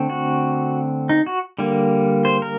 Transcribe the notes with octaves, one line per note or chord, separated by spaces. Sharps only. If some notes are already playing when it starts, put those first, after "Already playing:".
Already playing: D3 A3 C4
F#4
D#4
F#4
D3 G3 A#3
C5
A#4